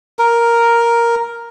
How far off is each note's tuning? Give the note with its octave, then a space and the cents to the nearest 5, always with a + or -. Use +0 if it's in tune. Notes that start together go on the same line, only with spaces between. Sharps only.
A#4 +5